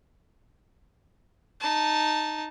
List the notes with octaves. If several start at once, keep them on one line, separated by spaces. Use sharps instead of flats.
D#4 A5